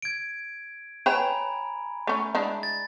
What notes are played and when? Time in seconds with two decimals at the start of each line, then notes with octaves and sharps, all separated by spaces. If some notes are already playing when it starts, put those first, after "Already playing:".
0.02 G#6 D7
1.06 B4 C#5 G5 G#5 A#5 B5
2.07 A3 C#4
2.35 G#3 D4 E4
2.63 A6